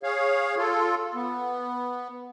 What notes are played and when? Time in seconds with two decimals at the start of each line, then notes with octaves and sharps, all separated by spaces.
0.03 G#4 C#5 F5
0.58 F4 A4
1.15 B3